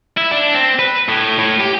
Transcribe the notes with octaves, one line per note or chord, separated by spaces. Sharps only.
E4
D4
C4
B4
A2
A2
G4